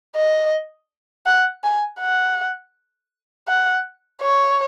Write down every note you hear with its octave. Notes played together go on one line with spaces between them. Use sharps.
D#5
F#5
G#5
F#5
F#5
C#5